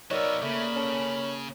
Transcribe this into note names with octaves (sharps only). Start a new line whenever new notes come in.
F#3 B3 D#4 A#4 C#5 D5 E5
C#3 A3 A#3 B5
C#4 A4